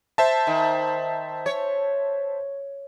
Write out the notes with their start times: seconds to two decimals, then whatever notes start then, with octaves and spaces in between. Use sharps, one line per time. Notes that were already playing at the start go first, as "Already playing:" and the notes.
0.18 C5 E5 A5
0.47 D#3
1.46 C#5